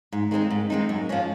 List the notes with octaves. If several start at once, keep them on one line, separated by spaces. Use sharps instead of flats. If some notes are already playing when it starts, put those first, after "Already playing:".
G#2
D#3 G#3 C4 D#4
G#2
D#3 G#3 C4 D#4
F#2
F3 G#3 C#4